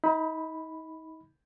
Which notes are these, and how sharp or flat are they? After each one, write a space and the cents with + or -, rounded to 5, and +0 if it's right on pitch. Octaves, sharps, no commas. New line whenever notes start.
D#4 +35 B5 +0